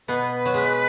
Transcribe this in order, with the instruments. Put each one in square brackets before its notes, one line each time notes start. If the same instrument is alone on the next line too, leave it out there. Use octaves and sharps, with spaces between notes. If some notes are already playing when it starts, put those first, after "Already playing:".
[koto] B2 B3 [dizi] B4
[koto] F#3
G#3